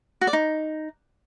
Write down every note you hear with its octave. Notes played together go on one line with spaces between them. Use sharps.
F#4
D5
D#4